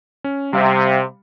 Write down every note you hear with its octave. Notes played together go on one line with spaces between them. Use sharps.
C#4
C3 G3 F5